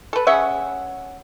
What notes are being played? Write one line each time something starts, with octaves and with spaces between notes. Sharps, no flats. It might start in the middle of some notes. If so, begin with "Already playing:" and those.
A4 B4
C#4 G#4 E5 F#5